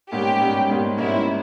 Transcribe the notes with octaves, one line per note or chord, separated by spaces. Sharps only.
G#2 G3 A#3 C#4 G4
G#2 G3 A#3 C#4
G#2 G3 A#3 C#4
G#2 G3 A#3 C#4 E4